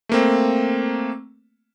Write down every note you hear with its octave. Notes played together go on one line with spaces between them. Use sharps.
A3 A#3 C4